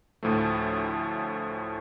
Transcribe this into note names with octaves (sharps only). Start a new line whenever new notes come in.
D2 A2 F3 A3